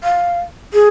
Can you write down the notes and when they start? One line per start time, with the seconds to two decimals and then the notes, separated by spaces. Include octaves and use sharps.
0.04 F5
0.73 G#4